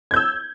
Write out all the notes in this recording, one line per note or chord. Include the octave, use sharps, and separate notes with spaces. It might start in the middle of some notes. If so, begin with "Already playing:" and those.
E6 G6 G#6